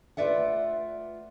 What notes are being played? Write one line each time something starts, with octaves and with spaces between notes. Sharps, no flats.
A3 F4 B4 D5 E5 F#5